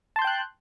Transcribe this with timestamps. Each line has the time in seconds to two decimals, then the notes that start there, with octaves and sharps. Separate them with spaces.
0.16 A5
0.19 C6
0.22 G6
0.24 G5
0.27 F#6